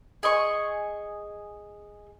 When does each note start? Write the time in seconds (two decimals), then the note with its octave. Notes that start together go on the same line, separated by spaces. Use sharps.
0.23 G#4 D#5 C#6